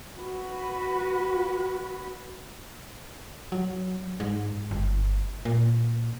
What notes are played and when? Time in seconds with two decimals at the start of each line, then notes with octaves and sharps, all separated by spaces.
0.19 F#4 B4
3.52 F#3
4.20 G#2
4.71 G1
5.45 A#2